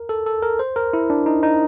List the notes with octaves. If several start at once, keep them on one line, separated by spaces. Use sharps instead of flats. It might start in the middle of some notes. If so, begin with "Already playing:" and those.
Already playing: A#4
A4
A4
A#4
C5
A#4
E4
D4
D#4
D#4